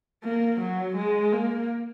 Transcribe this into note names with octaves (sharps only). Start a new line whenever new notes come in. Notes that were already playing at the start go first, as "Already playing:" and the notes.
A#3
F#3
G#3
A#3